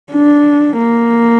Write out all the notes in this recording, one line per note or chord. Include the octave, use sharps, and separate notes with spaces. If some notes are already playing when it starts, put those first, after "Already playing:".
D4
A#3